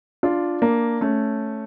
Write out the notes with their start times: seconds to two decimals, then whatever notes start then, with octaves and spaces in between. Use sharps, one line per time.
0.23 D4 F4
0.62 A#3 D4
1.01 A3 C#4